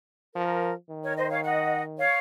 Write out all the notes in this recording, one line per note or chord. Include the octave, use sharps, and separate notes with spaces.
F3 A#4
D#3
A#4 C#5
C5 D#5
C#5 F5
D#5 F#5
C#5 F5